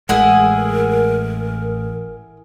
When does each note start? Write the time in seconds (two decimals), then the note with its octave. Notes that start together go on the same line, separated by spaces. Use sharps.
0.09 A1 G#3 E4 G#4 A#4 F#5